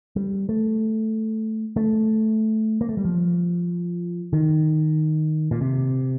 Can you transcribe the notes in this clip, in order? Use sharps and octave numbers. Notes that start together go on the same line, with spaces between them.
G3
A3
A3
A#3
A3
G3
F3
D#3
A#2
C3